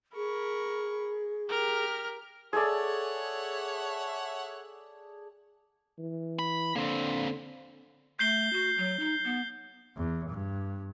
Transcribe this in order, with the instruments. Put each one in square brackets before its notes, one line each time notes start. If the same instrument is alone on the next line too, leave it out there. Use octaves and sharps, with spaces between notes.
[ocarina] G#4 [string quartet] A#4 B5 C#6
[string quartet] G4 [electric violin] A#4 F6
[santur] G#4 A4 D5 [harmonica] C#5 E5 F#5
[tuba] E3
[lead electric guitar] B5
[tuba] D3 [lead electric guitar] A#3 C4
[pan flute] A3 [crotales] G6 C7 G7
[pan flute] F#4
F#3
D#4
B3
[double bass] E2
G2